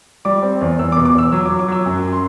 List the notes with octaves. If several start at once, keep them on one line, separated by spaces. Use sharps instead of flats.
G3 D6
C4
E2
E2 E6
D6
B2
D6
E2 E6
F#3 E6
D6
F#3
D6
F#3 E6
F#2
C6